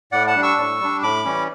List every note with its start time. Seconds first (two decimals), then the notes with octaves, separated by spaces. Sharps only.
0.12 A2 D5 F#5
0.27 F#5 A5
0.36 G3 D4
0.43 C#6 E6
0.57 A2
0.80 G3 D4
1.02 A2 B5 D6
1.25 E3 G3 C#4